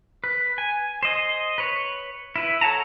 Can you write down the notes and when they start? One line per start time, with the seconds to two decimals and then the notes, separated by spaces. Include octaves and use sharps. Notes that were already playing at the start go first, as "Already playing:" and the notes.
0.24 B4
0.58 G#5
1.03 C5 D#5
1.58 B4 C#5
2.36 E4 B4
2.61 A4 C#5 F#5 A5 A#5